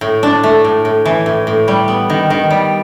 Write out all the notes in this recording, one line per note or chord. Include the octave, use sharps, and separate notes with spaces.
A2
D4
A3
A2
A2
E3
A2
A2
G3
B3
D#3
D#3
G3